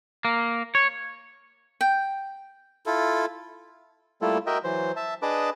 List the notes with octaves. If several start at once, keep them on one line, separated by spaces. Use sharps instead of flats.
A#3
C#5
G5
E4 F4 A4
G3 A3 A#3 E4 F4 A4
F#4 A#4 D#5 E5 G5
E3 F#3 C5
E5 A5
D4 G#4 B4 D#5 A5 D6